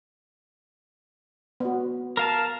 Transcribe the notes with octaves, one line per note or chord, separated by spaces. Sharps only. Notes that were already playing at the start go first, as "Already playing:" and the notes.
B3 F#4
A#4 F5 A5